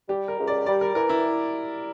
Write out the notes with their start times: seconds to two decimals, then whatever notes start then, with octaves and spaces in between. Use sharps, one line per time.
0.09 G3 G4
0.28 A#4
0.38 C#2
0.47 D5
0.66 G3 D5
0.81 A#4
0.95 E3 A#4
1.09 E4